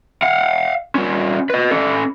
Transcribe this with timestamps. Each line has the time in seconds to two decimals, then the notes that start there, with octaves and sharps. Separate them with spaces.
0.23 F5 F#5
0.95 G3 C#4
1.50 B4 D#5
1.71 C#4 A4